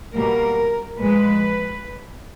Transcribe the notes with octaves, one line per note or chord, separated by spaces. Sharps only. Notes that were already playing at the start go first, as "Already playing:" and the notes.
B2 G3 A#3 A#4
A#2 F3 G#3 B4